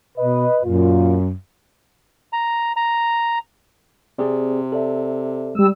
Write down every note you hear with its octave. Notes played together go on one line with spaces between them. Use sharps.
B2 B4 D#5
F#2 A#2 F4
A#5
A#5
C3 C4 G#4 D5
A4 D5 E5
G3 G#3 E6